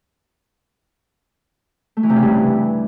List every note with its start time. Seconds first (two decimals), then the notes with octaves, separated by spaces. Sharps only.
1.97 A3
2.03 E3
2.10 C3
2.16 C#3
2.23 G2